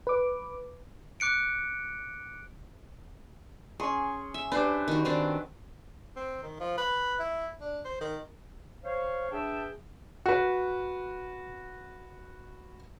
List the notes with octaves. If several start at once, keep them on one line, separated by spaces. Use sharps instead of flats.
B4 D6
D6 F#6 C#7 D7
C#4 G#4 C6 C#6
E5
D4 G4 B4 C5
D#3 F#4
D#3 C4 D4
C4
D#3
F3
B4
E4
D4
C5
D#3
C5 C#5 F5
D4 G#4 B4 E5 G5 A5
F#4 B4